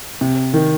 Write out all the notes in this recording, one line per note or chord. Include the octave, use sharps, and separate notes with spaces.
C3
D#3